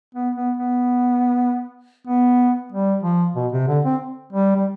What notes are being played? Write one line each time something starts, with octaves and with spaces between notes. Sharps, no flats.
B3
B3
B3
B3
G3
F3
B2
C3
D3
C4
G3
G3